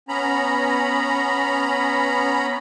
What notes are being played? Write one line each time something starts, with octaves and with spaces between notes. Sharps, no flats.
B3 C#4 A#5 B5